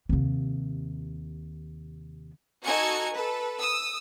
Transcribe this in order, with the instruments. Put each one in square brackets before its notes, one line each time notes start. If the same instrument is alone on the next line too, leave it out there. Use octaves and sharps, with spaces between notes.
[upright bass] D#2 C3
[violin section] D#4 F#4 A4 G#5 G#6 C#7
A4 B4
D#6 E6